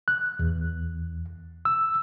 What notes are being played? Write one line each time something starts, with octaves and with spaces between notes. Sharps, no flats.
F#6
E2
E6